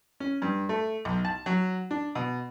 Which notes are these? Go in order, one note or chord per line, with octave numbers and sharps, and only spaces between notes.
C#4
G2
A3
B1
A5
F#3
D4
B2